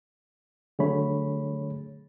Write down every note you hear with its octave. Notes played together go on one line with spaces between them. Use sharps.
D3 F#3 A3 G#4 C#5 B5